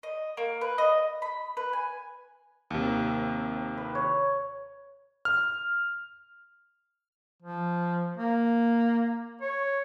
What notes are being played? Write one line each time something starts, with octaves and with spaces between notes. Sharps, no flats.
D#5
A#3
B4
D#5
B5
B4
G#5
D#2 C3
B4
C#5
F6
F3
A#3
C#5